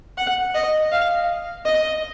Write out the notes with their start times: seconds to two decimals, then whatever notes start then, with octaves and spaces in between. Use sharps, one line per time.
0.18 F#5
0.54 D#5
0.92 F5
1.65 D#5